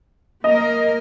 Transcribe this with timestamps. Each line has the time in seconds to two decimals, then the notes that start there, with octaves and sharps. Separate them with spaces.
0.44 A#3 A#4 D#5